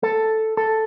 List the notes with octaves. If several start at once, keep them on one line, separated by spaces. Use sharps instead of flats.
A4
A4